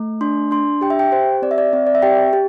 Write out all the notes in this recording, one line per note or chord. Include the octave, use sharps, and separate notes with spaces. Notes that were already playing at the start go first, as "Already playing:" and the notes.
Already playing: A3
D4 C6
D4 C6
G4 G5
E5
G5
G4 C5
C4 D5
E5
D5
C4 E5
D5
E5
G4 G5
G4